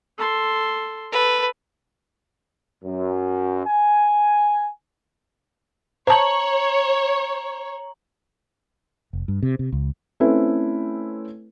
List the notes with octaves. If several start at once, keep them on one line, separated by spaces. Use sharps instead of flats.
A4 C6
A4 B4
F#2
G#5
C5 C#5 A5 A#5 F#7
F1
G2
C3
C3
C#2
A3 C4 C#4 E4 B4